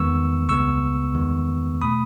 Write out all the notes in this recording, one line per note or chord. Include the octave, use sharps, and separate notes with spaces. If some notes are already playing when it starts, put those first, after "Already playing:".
Already playing: E2 D#3 G#3 B3 C#6 E6
C#2 C#3 G#3 B3 C#6 E6
E2 D#3 G#3 B3
B2 A3 B5 D#6